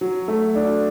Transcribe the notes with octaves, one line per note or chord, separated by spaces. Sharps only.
F#3
A3
D4